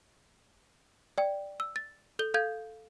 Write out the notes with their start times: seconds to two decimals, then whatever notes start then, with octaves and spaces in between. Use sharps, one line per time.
1.18 D5 G5
1.60 E6
1.76 A6
2.19 A4 G6 G7
2.34 A4 F5 G6 G#6